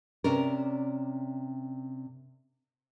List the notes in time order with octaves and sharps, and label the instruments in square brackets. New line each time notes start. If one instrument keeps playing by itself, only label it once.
[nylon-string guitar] C3 C#4 D4 A#4